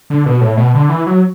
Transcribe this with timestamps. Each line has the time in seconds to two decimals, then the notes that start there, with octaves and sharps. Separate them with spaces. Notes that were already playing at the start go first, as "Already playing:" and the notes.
0.10 D3
0.26 B2
0.41 A2
0.57 B2
0.74 D3
0.89 E3
1.06 F#3